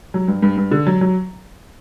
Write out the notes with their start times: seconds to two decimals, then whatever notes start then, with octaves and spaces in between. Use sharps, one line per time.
0.14 F#3
0.28 G2
0.42 G2
0.57 G2
0.71 D3
0.87 F#3
1.01 F#3